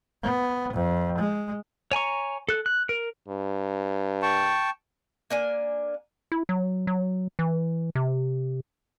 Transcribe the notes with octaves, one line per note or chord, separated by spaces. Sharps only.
B3
F2
G#3
C#5 G#5 A#5 C#6
A4 F#6
F#6
A#4
G2
G5 A5 C#6
A#3 D4 G#5
E4
F#3
F#3
E3
C3